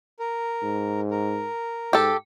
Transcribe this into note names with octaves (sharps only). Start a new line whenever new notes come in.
A#4
G#2
A#4
G#2 G4 A4